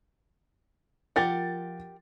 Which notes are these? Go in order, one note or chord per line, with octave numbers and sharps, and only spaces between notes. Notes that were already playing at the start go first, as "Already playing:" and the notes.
F3 G4 A#4 F#5 A6